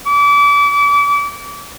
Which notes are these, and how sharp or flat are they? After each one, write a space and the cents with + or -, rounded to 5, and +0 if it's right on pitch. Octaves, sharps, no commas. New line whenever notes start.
D6 -35